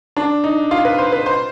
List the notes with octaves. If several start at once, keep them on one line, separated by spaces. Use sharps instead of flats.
D4
D#4
F4
B4
C5
B4
C5